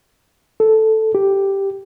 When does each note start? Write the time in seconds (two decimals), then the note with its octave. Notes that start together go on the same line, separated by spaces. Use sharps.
0.60 A4
1.15 G4